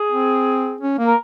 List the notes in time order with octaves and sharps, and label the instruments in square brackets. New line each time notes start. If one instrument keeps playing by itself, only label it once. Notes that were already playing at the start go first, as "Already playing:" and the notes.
Already playing: [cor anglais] G#4
[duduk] C4
C#4
A#3
[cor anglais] A#4